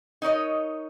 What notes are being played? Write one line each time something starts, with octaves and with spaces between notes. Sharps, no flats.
D#4 A#4 C#5 D#5